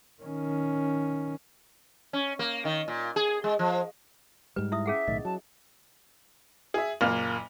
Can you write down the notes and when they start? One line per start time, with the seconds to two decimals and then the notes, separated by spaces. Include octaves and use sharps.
0.22 D#3 C#4
2.13 C#4
2.39 A#3
2.65 D#3
2.88 A#2
3.16 G#4
3.44 G#3
3.59 F3
4.56 G#2 G3 B4
4.72 E4 E5 D#6
4.86 C#4 G#4 E5 F#5
5.08 B1 A2 D#3 D#5
5.25 F#3 A5
6.74 G#4 E5
7.01 F#1 A#2 A#3 F6 F7